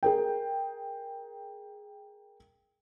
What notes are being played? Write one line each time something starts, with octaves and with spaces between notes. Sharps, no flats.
G#4 A#4 G5